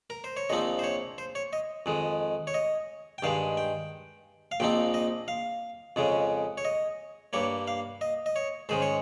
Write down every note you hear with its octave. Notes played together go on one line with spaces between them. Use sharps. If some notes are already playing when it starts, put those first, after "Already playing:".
A#4
C5
C#5
A#1 A#2 F3 C4 D#4 D#5
C5
C#5
C5
C#5
D#5
F2 D#3 G#3
C#5
D#5
G5
G2 D#3 G#3 F5
G5
F5
A#1 A#2 F3 C4 D#4 G5
D#5
F5
F2 C#3 G#3 C#4
C#5
D#5
G2 G3 A#3 C#5
F5
D#5
D#5
C#5
G#2 D#3 G#3 C#4 C5
C#5